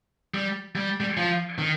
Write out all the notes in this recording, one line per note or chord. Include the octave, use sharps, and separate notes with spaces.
G3
G3
G3
F3
D#3